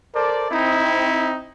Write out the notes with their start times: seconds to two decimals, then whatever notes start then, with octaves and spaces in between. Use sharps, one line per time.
0.15 A4 A#4 C5 D5
0.51 C4 D#4 E4